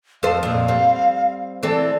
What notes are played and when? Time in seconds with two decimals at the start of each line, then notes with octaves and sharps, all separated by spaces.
0.23 F2 A4 C5 F5
0.43 F2 A#2
0.68 G3 C4
1.63 E3 C4 A4 D5